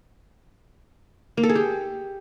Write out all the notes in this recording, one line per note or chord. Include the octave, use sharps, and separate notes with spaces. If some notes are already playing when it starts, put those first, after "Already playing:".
A#3
A4
G#4
G4